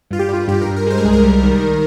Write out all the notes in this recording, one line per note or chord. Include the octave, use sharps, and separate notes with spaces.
G2 F4
G4
G3 F4
G2 G4
G2 A#4
A#4
G#3 C5
A#4
C2 G#4
A#4
G3
D#3